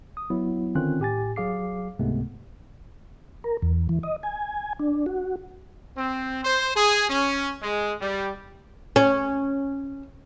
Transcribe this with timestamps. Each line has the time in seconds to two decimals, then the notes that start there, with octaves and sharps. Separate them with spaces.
0.17 D#6
0.30 F#3 B3 E4
0.75 D3 D#3 C4 C#4 F4 F#6
1.00 A2 G4 G#5 A6
1.36 F#3 G#4 F5 D6 C7
1.99 C#2 G#2 C3 G#3 A3 B3
3.44 A#4
3.62 E2
3.89 E3
4.03 D#5
4.23 G#5
4.79 D4
5.06 F#4
5.97 C4
6.44 C5
6.76 G#4
7.09 C#4
7.62 G#3
8.01 G3
8.96 C#4